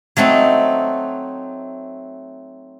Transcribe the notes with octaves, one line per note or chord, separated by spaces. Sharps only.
F#3 A3 C4 D#4